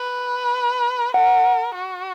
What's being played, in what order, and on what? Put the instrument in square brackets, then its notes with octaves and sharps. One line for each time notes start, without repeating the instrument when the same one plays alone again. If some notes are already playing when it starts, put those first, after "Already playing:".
Already playing: [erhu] B4
[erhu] A#4 [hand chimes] F#5
[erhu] F#4